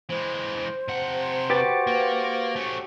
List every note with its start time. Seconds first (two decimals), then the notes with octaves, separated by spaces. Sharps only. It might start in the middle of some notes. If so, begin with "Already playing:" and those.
0.10 E3 G#3 C5
0.88 C3 F#5
1.50 F#4 G4 B4 A6
1.87 A#3
2.56 A3 C#4